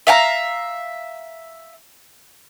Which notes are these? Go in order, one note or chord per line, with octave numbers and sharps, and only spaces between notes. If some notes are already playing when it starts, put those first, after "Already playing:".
E5 F5 G5 A#5